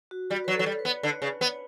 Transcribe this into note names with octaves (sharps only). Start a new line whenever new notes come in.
F#4
G3 F#4
F#3 B4
F#3 A4
G3
B4
B3
D3
C#3
B3